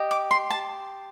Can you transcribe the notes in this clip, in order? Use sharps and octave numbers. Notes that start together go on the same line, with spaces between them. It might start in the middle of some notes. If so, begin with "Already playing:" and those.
Already playing: G4 D#5
D6
C6
A5